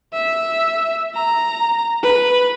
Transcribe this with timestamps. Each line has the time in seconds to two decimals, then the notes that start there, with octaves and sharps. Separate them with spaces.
0.13 E5
1.15 A#5
2.03 B4